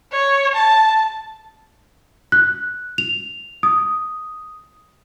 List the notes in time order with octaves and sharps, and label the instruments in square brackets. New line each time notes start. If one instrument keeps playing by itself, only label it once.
[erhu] C#5
A5
[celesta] F#6
F7
D#6